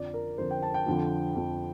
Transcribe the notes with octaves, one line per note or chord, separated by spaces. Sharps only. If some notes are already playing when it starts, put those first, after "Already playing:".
Already playing: F2 D3 F3 D5
A#4
F2 D3 F3 C5
G5
A5
G5
F2 D3 F3
F2 D3 F3